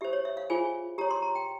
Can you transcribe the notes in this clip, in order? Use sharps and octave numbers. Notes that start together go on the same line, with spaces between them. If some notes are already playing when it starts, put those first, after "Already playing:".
G4 C5 E5
C#5
E5
F5
F4 G#4 C5 G#5
G4 C#5 A#5
C6
A#5
G5